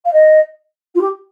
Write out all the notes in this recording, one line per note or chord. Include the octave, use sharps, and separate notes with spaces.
F5
D#5
F4
G4